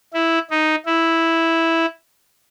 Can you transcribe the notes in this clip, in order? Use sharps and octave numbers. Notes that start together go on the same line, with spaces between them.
E4
D#4
E4